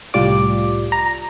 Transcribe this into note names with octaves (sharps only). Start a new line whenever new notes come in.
C2 A2 G3 F4 D5 D6
A#5